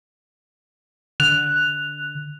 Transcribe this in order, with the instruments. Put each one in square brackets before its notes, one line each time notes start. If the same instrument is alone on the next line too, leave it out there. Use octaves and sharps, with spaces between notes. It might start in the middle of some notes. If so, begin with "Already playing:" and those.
[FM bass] D3 [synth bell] F#6 F7